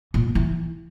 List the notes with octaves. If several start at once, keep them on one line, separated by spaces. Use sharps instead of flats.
A#2
E3